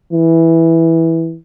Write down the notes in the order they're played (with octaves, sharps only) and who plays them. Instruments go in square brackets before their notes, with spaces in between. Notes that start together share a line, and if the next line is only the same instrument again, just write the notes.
[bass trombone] E3